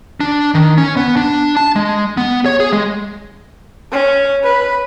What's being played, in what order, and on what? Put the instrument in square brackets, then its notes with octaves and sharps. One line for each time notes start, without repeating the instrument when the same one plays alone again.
[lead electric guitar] D4
D#3
C#4
B3
D4
A5
G#3
B3
C#5
G#4
G#3
[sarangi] C#4
B4